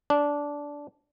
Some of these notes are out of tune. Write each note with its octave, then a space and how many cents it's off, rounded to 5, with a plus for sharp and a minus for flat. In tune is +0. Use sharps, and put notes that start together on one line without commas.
D4 -15